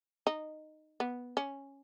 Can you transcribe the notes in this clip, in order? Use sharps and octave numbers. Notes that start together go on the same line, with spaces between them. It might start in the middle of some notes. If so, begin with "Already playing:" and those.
D#4
B3
C#4